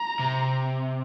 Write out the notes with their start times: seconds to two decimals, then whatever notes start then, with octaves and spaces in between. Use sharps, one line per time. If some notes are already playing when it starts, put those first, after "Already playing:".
Already playing: A#5
0.19 C3